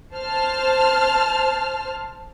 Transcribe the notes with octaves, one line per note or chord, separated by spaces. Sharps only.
C5 A5 F6